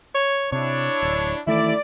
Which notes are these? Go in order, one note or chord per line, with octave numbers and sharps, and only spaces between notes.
C#5
C3 D4 E4 C#5
D1
D#3 E3 A3 E4 D5